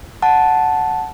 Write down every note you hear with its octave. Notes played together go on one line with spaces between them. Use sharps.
F#5 A5